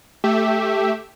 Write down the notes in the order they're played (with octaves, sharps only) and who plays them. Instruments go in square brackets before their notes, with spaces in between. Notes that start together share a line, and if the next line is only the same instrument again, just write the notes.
[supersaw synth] A3 G4 E5